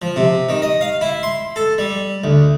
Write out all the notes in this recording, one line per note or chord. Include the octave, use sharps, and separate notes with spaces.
F3
C3
D#3
D#5
F5
E4
C6
A4
G3
D2